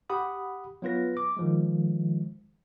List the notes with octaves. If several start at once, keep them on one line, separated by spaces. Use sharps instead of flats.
G4 F#5 B5 D#6
F#3 B3 F4 B4 A#6
D6
D#3 F3 G#3